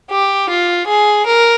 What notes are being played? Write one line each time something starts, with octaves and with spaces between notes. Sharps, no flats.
G4
F4
G#4
A#4